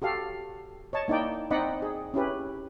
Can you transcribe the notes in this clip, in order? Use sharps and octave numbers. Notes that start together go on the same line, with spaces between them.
F#4 G4 A4 F5
C#5 D#5 A5
A#3 D#4 E4 D5 G5
C4 D#4 D5 D#5 F#5 B5
G#4
C#4 E4 G4 B4